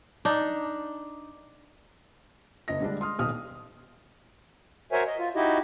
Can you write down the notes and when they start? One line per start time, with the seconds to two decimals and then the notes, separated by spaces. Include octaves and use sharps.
0.25 D4 D#4
2.68 F#1 D#5 A#6
2.81 D3 G3 G#3 D4
3.01 C6 D#6 F6
3.19 D#1 B1 G4 D#6 F6
4.92 F#4 A#4 C5 C#5 E5 G#5
5.07 D#5
5.18 F4
5.35 D#4 E4 F#4 G4 D#5